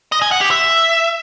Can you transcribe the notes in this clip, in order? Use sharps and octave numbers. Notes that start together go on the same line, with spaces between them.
D#5
G#5
F#5
G4
E5